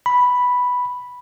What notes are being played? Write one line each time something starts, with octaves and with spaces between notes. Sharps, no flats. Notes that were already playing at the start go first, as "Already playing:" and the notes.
B5